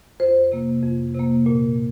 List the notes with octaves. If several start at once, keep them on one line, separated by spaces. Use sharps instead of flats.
F2 C5
C3 A#3
F2
C3 A#3
A#2